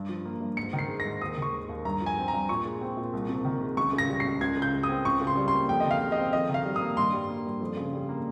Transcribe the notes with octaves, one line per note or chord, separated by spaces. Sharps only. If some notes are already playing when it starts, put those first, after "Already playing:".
Already playing: G2
F3
A#3
G2
G#2 C#7
D#3
C7
G#3
A#6
G#2
D#2 D#6
D#3 C#6
G#3
D#2
G2 A#5
F3
G#5
C4
A#5
G2
A#2 C#6
G#3
C4
A#2
C2
C3
D#3
G#3
C#2 C#6
C#3
A#6
G3
C#2 C7
C#2 G#6
C#3
G6
G#3
D#6
C4
C#2 C#6
C#3
C6
G3
C6
A#3
F2 G5
D#3 D#5
F5
G#3
D#5
C4
F2 D#5
D#3
F5
G3
D#6
A#3
G2 C6
G3
A#3
G2
F2
C#3
G3
A#3